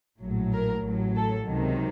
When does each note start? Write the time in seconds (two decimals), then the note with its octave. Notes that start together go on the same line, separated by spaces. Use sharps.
0.21 A#1 A2 F#3
0.53 A#4
0.84 A1 A2 F#3
1.16 A4
1.48 C#2 C3 D#3 F#3